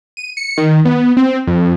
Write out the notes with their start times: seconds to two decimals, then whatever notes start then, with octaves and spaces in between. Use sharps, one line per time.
0.17 D#7
0.37 C#7
0.58 D#3
0.85 B3
1.17 C4
1.47 F2